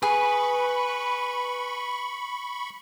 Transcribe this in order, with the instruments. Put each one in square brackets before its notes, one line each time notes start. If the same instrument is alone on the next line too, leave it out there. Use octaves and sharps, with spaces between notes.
[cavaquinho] G#4 [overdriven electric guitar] B4 [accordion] B5 C#6